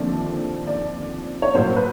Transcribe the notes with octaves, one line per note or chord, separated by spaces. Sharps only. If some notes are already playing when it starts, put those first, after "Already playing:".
Already playing: D#2 D3 F3 A3 C4 D5
D5
C#5
A2 F#3 A#3 C5
B4